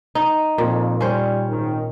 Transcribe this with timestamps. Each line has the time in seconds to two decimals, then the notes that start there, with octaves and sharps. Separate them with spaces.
0.15 D#4
0.58 F2 A#2 A#3
1.01 G3 C#4 C5
1.49 G#1 D#3